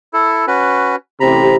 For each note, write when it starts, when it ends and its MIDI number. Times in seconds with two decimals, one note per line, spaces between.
0.13 0.46 64
0.13 0.46 69
0.47 0.96 61
0.47 0.96 66
0.47 0.96 71
1.20 1.55 33
1.20 1.55 48
1.20 1.56 82
1.20 1.56 83